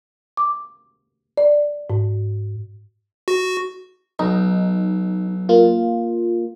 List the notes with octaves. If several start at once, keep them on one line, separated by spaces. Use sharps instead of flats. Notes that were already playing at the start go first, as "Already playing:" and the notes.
D6
D5
G#2
F#4
B1 D#4
A#3 F4